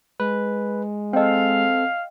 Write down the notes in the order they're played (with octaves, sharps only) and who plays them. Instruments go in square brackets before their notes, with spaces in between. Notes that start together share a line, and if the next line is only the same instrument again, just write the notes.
[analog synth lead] G#3 [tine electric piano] B4
[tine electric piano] C4 A4 [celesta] D#5 G5 [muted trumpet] F5